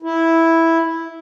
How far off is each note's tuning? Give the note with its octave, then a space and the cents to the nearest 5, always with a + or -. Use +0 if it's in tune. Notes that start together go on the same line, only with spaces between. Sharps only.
E4 -5